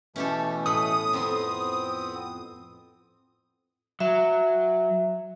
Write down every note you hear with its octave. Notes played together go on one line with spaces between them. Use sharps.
B2 E3 A3 C#4 G4 A4
A2 D#6
F2 B3 C4 C6
F#3 E5